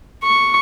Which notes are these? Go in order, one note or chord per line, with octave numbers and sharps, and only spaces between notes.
C#6